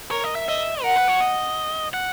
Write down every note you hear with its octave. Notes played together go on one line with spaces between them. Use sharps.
A#4 C#5
D#5
E5
D#5 E5
A#4 F#5
B4
C#5
D#5
F#5